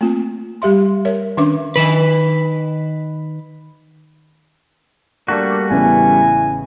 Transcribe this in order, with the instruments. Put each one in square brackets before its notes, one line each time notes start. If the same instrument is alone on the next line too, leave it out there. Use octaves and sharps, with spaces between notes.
[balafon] A3 A#3 C4 F4
G3 G4 E5 C6
A#4 C#5 E5
D#3 C#4 D4 B4 E5 D6
[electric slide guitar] D#3 B4
[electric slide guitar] G3 A3 F#4 [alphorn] A#3 [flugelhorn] D4
[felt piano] A1 C#3 B3 [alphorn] E4 [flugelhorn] G#5